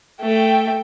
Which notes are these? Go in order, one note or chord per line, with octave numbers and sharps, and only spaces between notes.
A3 G5